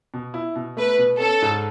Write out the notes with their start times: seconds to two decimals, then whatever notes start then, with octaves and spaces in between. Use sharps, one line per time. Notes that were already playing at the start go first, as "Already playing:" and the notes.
0.14 B2
0.34 E4
0.56 B2
0.77 A3 B4
0.98 B2
1.20 C#4 A4
1.42 G#2